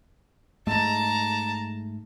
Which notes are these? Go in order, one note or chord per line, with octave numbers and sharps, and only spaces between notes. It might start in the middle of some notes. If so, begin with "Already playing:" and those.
G#2 G#3 A3 A5 A#5